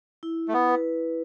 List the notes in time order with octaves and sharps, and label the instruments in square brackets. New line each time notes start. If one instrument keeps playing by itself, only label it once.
[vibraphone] E4
[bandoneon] A3
B3
[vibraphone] B4